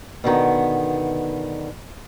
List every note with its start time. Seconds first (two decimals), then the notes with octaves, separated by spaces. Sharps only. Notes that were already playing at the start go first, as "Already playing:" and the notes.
0.24 B2 D3 D#3 B3